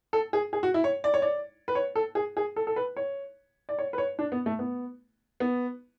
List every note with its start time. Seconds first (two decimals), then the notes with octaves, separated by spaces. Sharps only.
0.13 A4
0.33 G#4
0.53 G#4
0.63 F#4
0.74 E4
0.84 C#5
1.04 D5
1.14 C#5
1.22 D5
1.68 B4
1.75 C#5
1.96 A4
2.15 G#4
2.37 G#4
2.56 A4
2.67 A4
2.76 B4
2.97 C#5
3.69 D5
3.79 C#5
3.93 B4
3.98 C#5
4.19 D4
4.32 B3
4.46 A3
4.59 B3
5.40 B3